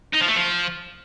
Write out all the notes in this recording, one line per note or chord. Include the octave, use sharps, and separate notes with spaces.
D#4
F3
A3
F3